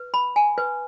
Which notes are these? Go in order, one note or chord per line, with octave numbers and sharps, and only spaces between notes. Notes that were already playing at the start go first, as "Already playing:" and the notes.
Already playing: B4
B5
G#5
B4